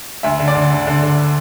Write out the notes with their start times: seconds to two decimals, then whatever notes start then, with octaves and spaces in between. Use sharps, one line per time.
0.23 D2 E5
0.39 D3
0.48 D5
0.55 D3
0.70 D3
0.87 D3
1.03 D3